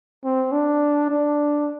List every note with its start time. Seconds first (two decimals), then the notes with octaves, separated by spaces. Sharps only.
0.24 C4
0.52 D4
1.10 D4